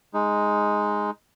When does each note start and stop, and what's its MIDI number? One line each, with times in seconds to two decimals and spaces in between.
0.14 1.11 56
0.14 1.11 63